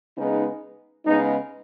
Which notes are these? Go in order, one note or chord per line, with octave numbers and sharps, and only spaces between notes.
C#3 G#3 B3 D#4
C#3 G#3 B3 D#4